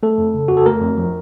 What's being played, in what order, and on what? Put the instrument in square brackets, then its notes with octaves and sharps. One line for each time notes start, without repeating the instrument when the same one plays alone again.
[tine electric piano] A3 A4
F2
C#3
F2 F#4
A4
A3 A#4
F2
F3